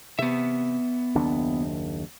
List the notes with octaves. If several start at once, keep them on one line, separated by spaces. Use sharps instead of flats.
C3 B3 E5
F#1 D#2 D4